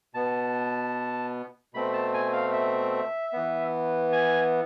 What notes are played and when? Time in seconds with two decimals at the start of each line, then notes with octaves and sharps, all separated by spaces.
0.14 B2 B3 A5
1.74 B2 A3 C4 B5
1.93 A5
2.14 G#5
2.33 F5
2.53 E5
3.33 E3 B3
4.13 G#5